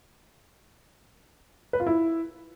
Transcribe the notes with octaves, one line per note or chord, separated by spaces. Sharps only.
B4
F4
E4